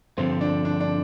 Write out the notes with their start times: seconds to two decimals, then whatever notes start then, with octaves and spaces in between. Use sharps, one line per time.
0.18 G2 D3 F3 C4
0.41 D4
0.65 D4
0.80 D4